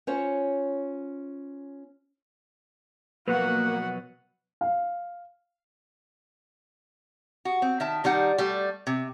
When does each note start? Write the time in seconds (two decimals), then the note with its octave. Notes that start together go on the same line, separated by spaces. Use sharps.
0.07 C#4 F4 C5 C#5
3.28 B2 F3 F#3 A#3 F#4 B4 F#5
4.61 F5
7.45 F#4
7.62 C4
7.80 D#3 E5 A5
8.04 D#3 G3 D#4 F#5
8.38 G3 A3
8.87 C3